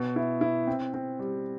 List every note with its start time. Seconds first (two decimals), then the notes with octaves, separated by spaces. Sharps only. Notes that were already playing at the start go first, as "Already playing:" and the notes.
Already playing: B2
0.16 E4
0.41 E4
0.67 C4
0.94 C4
1.19 G3